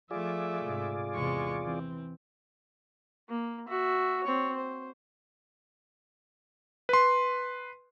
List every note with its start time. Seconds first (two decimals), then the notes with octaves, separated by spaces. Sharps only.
0.11 F3 A3 F4 G#4 D5 E5
0.63 G#2 C3
1.14 E2 C3 G#3 C#6
1.64 E3 C4
3.29 A#3
3.68 F#4 E5
4.23 C4 C#5
4.56 C5
6.89 B4 C6